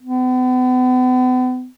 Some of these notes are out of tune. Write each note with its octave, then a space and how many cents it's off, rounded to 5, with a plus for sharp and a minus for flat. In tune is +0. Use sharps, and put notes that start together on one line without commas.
B3 +40